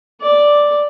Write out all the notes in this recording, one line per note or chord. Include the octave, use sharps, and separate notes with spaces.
D5